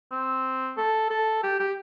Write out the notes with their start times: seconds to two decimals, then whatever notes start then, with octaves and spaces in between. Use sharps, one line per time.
0.11 C4
0.77 A4
1.10 A4
1.43 G4
1.60 G4